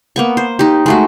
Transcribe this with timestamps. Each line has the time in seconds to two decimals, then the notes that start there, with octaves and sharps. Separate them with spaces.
0.16 A#3 B3 C#6
0.37 C5
0.59 D#4 G4
0.86 G#3 A3 F#4